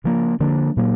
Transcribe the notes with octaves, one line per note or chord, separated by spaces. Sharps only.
C#3 F3 A#3
D3 F3 A#3 D4
A#2 F#3 A#3